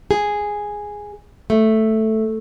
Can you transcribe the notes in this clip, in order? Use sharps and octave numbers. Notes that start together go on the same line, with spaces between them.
G#4
A3